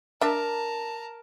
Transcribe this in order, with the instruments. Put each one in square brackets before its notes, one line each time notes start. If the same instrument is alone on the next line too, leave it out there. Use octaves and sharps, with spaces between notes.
[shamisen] D4 E5 [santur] A#4 [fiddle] A5 A#5